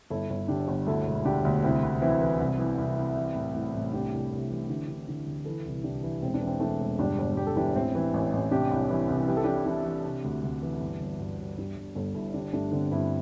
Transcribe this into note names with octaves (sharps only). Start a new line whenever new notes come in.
G1 E4 A4
G1
D3 D4 G4
G1
D2 E4 A4
E1
E4
D3 D4 G4
D2
C2 C4 E4
C2
E3 C4 E4
E3
C2
E3
C2
C3
E3
A2
A2
A1
C2 D4 G4
C2
C2
E3
D3
D3
D3
D2
E3 E4 A4
C2
C2 D4 G4
E3
E1 C4
D4
E3
C4
E3 A3 D4
E1
G1 D4 G4
G1
G1 G4
A4
E3 D4 G4
A1 C4 E4
E3
A1
A1
C3 D4 G4
C2
E3
C2
E3 G4
A4
E3 D4 G4
E4
E3 D4 G4
E3
C3
D2
D2
E3
G1
G1
G2
G2
G2 D4 G4
G2
G1 A4
G2 E4 A4
D3 D4 G4
G2 A3 D4
D3 C4
G2 C4 E4